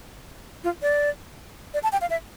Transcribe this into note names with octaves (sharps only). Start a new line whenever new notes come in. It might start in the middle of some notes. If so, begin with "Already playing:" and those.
F4
D5
D5
A5
G5
F5
E5